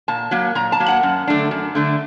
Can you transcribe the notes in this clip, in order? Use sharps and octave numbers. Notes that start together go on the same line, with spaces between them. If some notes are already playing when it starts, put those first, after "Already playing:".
A#2 A5
F#3 A#3
A#2 A#5
A5
F#3 A#3
F#5
F#2
D3 A3 D4
F#2
D3 A3 D4